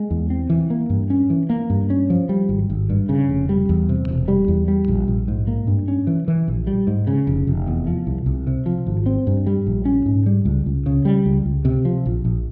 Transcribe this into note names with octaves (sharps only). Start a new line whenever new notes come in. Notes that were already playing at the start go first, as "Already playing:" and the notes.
Already playing: G#3
E2
C4
E3
A#3
G2
C#4
E3
A#3
G2
C#4
F3
G3
G#1
G#1
G2
C#3
F1
G3
E2
C3
E1
G3
E2
G3
A#1
A#1
G#2
A#3
G2
C#4
E3
E3
A#1
G3
G#2
C#3
F1
F1
E2
F3
C2
C2
C3
F3
G#1
C4
G2
G3
A#1
C#4
G#2
G3
C#2
C#2
C#3
G3
C#2
C#2
C3
F3
A#1
A#1